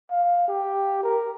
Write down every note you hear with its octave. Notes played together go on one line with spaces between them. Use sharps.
F5
G4
A#4